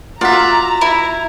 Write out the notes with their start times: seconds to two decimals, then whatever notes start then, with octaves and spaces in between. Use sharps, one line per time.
0.21 F4 F#4 D5 E5 A#5
0.81 E4